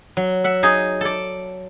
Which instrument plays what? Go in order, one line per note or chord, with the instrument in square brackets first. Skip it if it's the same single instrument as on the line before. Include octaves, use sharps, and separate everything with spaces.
[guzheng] F#3
E5 F#5
[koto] D#4 G#4
A4 D5